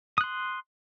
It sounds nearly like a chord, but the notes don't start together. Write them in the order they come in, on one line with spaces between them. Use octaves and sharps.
D#6 F#6 C6